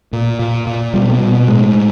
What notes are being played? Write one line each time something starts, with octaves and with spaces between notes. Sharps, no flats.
A#2
A#2
A#2
B2 G3
B2
A2 G#3
A2